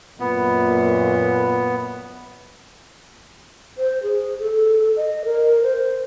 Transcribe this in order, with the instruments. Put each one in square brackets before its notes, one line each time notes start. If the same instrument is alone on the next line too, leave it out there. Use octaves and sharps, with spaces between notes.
[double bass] F#2 [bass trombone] A#2 [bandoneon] B3
[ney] C5
G#4
A4
D#5
A#4
C5